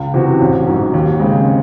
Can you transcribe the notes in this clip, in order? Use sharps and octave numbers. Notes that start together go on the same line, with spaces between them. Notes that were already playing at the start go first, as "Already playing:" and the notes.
Already playing: C#2
C3 E3 C4 F#4
A1
G#2 F#3
D#2
C#3 G#3 C4